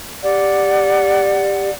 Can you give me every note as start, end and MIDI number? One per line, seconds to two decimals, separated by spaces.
0.23 1.69 67
0.23 1.70 74
0.23 1.70 78